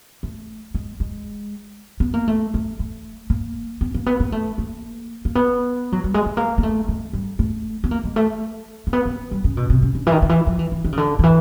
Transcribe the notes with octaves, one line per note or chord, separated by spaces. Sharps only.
A3
G#3
G#3
B3
A#3
A3
A3
A3
A#3
B3
A#3
B3
A#3
A3
A#3
A#3
B3
F#3
G3
G#3
A3
A#3
A#3
A3
G#3
G3
A3
B3
A#3
G#3
A3
A#3
B3
A#3
G3
C#3
B2
C3
C#3
D3
E3
D#3
D#3
E3
F3
E3
E3
D#3
C#3
D3
D#3
E3